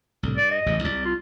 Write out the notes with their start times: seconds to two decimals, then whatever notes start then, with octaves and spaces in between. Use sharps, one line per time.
0.23 C2 A2 D3
0.37 G2 D5
0.51 D#5
0.66 A1 E2 C#3
0.84 C2 D5
1.05 F4